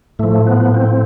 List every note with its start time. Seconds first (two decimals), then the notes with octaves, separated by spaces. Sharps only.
0.19 A2 F3 A3
0.47 B3
0.74 C4